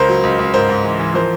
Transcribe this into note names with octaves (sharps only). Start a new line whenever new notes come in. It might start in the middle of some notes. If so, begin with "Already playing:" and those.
Already playing: C#2 A#4 C5
F#3
C#2
C#2
G#2 A#4 C5
G#2
E3
E3
F3 A#4 C5